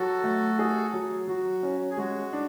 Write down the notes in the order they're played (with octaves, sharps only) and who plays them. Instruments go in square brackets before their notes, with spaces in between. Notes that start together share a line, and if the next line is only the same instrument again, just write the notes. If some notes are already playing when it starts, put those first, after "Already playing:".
Already playing: [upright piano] F#3 [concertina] F#4 A4
[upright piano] A3
G#4
F#3
[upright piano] F#3 [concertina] F#4
[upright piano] C#4
[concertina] G#4
[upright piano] G#3 [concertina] F#4
[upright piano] D4